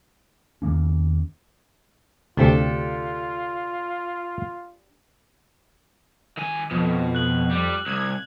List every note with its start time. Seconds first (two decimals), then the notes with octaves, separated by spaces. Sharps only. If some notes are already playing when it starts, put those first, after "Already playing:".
0.62 E2 D#3 A#3 C#4
2.37 D2 C3 D4 F4 G4 A4
6.37 D#3 G#5
6.71 F2 B2
7.15 F#6 F#7
7.51 G3
7.86 C2 G#6